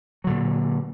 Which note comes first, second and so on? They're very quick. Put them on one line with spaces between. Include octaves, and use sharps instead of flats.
F#3 D3 A#2